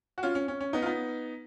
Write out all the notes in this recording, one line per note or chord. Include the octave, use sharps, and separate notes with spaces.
F#4
C#4 F4
C#4
C#4
C#4
B3 D#4
F4
B3 D#4